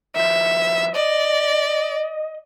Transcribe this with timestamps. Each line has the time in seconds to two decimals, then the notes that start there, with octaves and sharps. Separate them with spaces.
0.16 D#3 F3 E5
0.96 D5 D#5